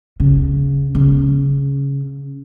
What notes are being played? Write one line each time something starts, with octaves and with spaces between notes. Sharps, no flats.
C#3
C#3